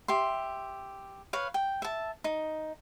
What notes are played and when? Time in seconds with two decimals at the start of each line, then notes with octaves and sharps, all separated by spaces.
0.08 G4 E5 C6
1.33 B4 C#5 F5
1.54 G5
1.82 E5 A5
2.24 D#4